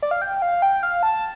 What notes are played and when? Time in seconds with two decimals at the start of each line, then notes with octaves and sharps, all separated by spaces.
0.02 D5
0.11 F5
0.22 G5
0.42 F5
0.62 G5
0.83 F5
1.03 A5